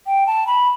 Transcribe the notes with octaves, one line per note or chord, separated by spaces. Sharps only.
G5
A5
B5